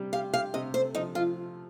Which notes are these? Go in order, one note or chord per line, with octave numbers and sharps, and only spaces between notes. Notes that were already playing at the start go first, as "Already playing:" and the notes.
Already playing: C3 G3 G4
G4 F5
G4 F5
C3 D#5
A3 C5
F3 D#4
F3 F4